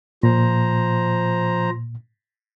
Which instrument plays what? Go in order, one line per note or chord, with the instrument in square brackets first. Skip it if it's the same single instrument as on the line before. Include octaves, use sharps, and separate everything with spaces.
[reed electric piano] A#2 [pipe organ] F3 C5 A#5